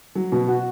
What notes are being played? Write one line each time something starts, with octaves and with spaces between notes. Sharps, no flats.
F#3
B2
F#4